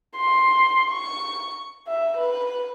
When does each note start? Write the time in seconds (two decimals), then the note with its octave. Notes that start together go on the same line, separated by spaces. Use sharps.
0.17 C6
0.91 C#6
1.87 E5
2.17 B4